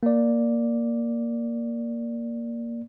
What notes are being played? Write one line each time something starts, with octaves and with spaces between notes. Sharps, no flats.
A#3 D5